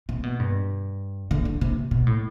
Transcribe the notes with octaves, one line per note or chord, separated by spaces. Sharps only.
C3
B2
G2
D3
D3
C3
B2
A2